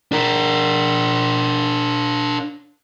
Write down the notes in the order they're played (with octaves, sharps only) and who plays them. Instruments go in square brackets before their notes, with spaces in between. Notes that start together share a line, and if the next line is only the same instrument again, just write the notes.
[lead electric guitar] D4 A#4